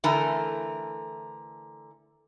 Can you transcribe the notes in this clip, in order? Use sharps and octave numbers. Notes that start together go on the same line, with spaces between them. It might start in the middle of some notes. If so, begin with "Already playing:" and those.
D3 E3 A3 A#4